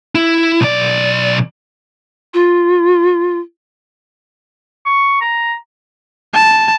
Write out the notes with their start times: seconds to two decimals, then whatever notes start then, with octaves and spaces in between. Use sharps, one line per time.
0.15 E4
0.61 B1 D5
2.34 F4
4.86 C#6
5.21 A#5
6.34 A5